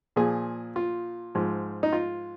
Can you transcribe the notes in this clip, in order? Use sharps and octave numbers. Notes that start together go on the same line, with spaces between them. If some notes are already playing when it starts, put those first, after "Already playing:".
A#2 F3 G#4
F4
G#2 F3
D#4
F4